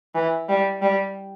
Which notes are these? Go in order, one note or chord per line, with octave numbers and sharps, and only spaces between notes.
E3
G3
G3